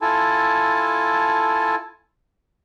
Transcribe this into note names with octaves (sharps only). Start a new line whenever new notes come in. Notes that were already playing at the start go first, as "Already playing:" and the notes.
E4 F4 A4 G#5 A5